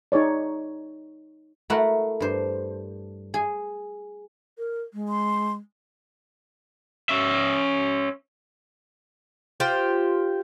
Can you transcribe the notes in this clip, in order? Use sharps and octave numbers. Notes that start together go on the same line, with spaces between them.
D#4 G#4 C#5 D5
A3 E4 F#4 A#4 F#5
G2 C5
G#4
A#4
G#3
C6
C#4 E5
F4 G4 C5 G5